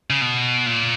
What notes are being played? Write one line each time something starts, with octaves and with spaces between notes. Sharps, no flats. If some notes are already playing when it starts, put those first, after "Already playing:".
C#3
B2
A#2